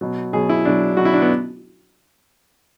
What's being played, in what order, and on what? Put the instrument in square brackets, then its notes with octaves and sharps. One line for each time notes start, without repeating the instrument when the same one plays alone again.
[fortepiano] B2 F#3
B2 F#3 G#4
E4
B2 F#3 D4
B2 F#3 F#4
E4
D4
B3